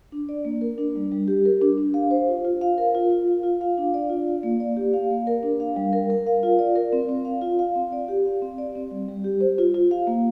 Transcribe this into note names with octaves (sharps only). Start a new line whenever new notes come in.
D4
D5
A#3
A#4
D4
G3
G3
G4
A#4
D4
D4
F5
C5
F4
F4
F5
A#4
F4
F4
F5
F4
F5
D4
D5
F4
F5
A#3
D5
G4
F5
A#3
A#4
D4
F5
G3
A#4
A#4
F5
F4
D5
A#4
C4
C4
F5
F4
F5
C4
D5
G4
F5
C4
D5
C4
G3
G3
G4
C5
F4
F4
F5
A#3